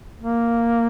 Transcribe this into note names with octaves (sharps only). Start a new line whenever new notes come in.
A#3